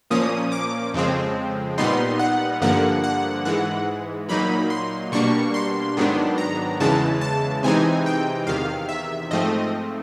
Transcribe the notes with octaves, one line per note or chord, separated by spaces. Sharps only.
A#2 F3 A#3 C#4 D#6
D6
F2 C#3 F3 G#3 C4
A#2 G3 B3 D#4 C6
F#5
G2 D3 F3 A#3 F#5
F#5
G#2 E3 G#3 F#5
A#2 F#3 A#3 D#4 B5
C6
B2 G3 A#3 D4 C#6
C6
G#2 D#3 F#3 B3 D4
A#5
E2 C#3 E3 G#3 A5
A5
C3 E3 G#3 C4 D#4 G#5
G5
E2 C3 D#3 F5
E5
G#2 F3 A3 C4 D#5